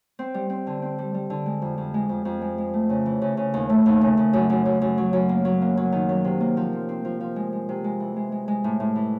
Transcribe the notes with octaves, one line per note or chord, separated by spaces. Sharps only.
C4
G3
C4
D3
C4
G3
G3
D3
G#3
F2
F2
G#3
F2
F2
G#3
G#3
A3
C#3
E3
C#3
C#3
D#2
A3
D#2
C#3
C#3
F#2
F#2
F#2
F#2
F#3
F#2
A#3
F#3
A#3
F#3
D#3
F#3
C3
A#3
F3
C4
C4
F3
F3
G#3
G#3
C3
G#3
E3
G#3
G#3
G#3
A2
A2
E3